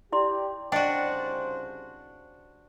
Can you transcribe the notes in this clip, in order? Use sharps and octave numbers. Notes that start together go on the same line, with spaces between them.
E4 G4 D5 C6
C2 C#3 D4 F#4 C5 D5 D#5 G5